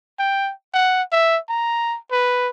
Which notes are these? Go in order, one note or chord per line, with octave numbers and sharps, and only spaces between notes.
G5
F#5
E5
A#5
B4